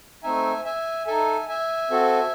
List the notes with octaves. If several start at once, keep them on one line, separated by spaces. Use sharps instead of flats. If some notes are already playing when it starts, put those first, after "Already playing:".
A3 C4 D#4 E5 G#5
E5 G#5
D#4 A4 E5 G#5
E5 G#5
C4 F#4 A4